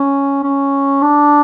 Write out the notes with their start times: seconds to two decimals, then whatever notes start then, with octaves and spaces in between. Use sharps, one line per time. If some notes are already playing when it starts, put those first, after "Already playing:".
Already playing: C#4
0.43 C#4
1.02 D4